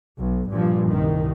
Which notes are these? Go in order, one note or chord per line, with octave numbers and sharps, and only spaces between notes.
B1
G2 A#2 F3
C2 D#3